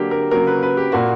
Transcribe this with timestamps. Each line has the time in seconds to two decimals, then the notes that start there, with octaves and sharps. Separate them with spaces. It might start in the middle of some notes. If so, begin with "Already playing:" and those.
Already playing: D3 F#3 A#3 G4
0.11 A#4
0.31 C#3 F#3 A#3 A#4
0.47 B4
0.62 B4
0.77 G4
0.92 A#2 A#3 F#4